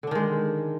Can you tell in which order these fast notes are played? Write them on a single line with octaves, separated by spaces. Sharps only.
D3 D4 D#3 G#3